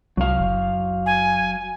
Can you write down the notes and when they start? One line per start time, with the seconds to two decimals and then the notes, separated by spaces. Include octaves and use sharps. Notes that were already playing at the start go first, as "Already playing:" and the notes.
0.17 C2 F#3 F5
0.40 F#1
1.06 G#5